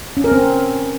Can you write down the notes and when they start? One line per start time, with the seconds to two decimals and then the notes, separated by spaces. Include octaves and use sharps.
0.17 C#4
0.24 A#4
0.32 C4